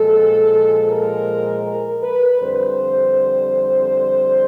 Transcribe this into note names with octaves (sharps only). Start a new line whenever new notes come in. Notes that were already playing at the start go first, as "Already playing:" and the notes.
Already playing: A#2 F3 G#3 A4
A#4
A#4
B4
F2 D3 G3 C5